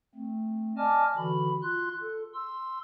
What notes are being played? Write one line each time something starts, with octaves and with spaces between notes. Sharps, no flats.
A3 C4
D5 D#5 G#5 A5 D6 F6
D3 E3 F#4 B5
F4 C6 F#6
A4
C6 E6